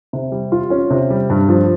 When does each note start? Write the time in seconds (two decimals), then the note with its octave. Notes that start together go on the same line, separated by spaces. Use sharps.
0.13 C3
0.32 G3
0.52 F4
0.70 C#4
0.90 C3
1.10 G3
1.30 G2
1.49 F3